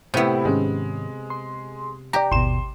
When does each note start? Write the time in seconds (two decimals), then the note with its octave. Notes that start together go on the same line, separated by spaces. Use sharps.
0.14 A2 C3 B3 E4
0.45 G#2 D#3 G#3 C#4
1.30 C6
2.13 G4 D5 G5 A#5
2.32 G#1 D#2 B2 C6 E7